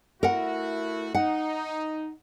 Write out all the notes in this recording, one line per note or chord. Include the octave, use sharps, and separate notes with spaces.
A3 E4 F#4 A#4 F#5
D#4 F#5